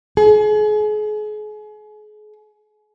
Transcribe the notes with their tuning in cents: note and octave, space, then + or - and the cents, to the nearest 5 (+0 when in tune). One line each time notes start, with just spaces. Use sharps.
G#4 +35